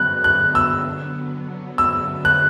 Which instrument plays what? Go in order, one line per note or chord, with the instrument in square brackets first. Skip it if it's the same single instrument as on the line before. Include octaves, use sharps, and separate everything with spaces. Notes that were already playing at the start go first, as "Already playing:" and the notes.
Already playing: [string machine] D3 F#3 B3 [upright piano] F#6
[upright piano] F#6
E6
E6
F#6